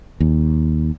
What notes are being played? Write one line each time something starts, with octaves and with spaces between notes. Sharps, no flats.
D#2